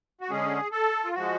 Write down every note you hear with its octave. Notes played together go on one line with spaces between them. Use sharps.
F#4
D3 G#3 C#4 G#4
A4
F4
F3 G#3 F#4